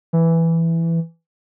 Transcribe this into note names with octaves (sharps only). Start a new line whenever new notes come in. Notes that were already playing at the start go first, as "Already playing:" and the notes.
E3